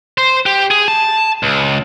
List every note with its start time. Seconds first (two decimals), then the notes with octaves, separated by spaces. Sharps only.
0.18 C5
0.46 G4
0.71 G#4
0.88 A5
1.43 C#2